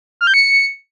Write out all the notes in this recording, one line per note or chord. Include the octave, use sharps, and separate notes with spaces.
F6
G6
C#7